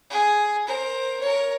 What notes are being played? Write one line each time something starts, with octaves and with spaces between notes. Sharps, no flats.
G#4
A#4 C5
A#4 C#5